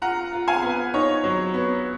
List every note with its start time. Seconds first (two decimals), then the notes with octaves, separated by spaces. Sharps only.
0.02 F4 F#5 A#5
0.33 F4
0.48 F5 G#5
0.62 B3
0.94 D#4 C#5
1.24 F#3
1.54 B3